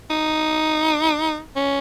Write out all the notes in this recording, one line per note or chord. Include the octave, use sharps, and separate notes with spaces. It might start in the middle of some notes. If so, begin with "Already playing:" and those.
D#4
C#4